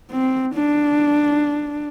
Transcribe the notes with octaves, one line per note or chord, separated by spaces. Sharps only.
C4
D4